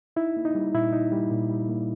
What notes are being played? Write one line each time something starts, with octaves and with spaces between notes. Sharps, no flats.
D#4 E4
A#3
D#4
G3
A#2 E4
D#4
G3
A#2
G3
A#3